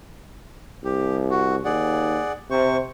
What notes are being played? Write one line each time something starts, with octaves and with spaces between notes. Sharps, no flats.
C2 G4
F#4
D#2 G#4 D5 F#5
C3 C5 C#6